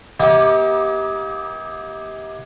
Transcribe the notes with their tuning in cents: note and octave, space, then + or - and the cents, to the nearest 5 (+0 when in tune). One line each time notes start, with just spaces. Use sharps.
A#3 +35 D#4 +45 G4 +0